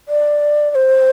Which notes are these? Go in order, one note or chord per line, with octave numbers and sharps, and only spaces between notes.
D5
D5
C5